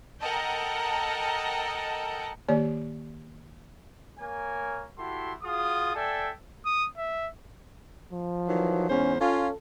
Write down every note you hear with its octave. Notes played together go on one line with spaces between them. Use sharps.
A4 A#4 D#5 F#5 G5 A5
D#3 A#3 G4 C#5 D5
A#3 A#4 C#5 G#5
E4 F#4 G4 A4 C6
F4 F#4 G#4 D#6
A4 D5 E5 G5 G#5
D#6
E5
F3
D#3 E3 F#3
E2 G#2 C#4 C5
C#4 F4 A4